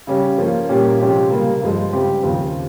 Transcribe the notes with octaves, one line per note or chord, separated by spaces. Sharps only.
C#3 G3 C#4 G4
F3 A#3 C#4
A#2 G3 A#3 C#4 G4
C3 F3 G#3 C#4 G4
C#3 G3 A#3
G2 F3 G#3
C#3 G3 C4 G4 C5
D#2 C#3 F3 C4